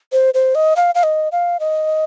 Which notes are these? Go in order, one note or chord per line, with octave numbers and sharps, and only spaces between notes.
C5
C5
D#5
F5
F5
D#5
F5
D#5